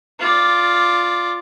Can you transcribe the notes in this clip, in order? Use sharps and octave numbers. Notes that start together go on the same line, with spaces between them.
F4 D5